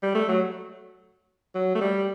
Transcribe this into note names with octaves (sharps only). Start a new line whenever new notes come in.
G3
A3
F#3
F#3
A3
G3